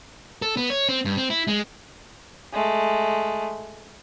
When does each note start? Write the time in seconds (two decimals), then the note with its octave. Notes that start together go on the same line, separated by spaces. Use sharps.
0.42 A4
0.57 B3
0.70 C#5
0.89 C4
1.05 G2
1.17 C4
1.30 E4
1.48 G#3
2.53 G#3 A3